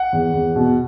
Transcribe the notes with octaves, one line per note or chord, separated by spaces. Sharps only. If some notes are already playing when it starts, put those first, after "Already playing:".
Already playing: F#5
E2
E2
B2